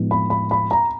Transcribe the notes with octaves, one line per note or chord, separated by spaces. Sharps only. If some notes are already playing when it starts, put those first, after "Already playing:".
Already playing: A2 F3 G#3 B3 D#4
B5
B5
B5
A#5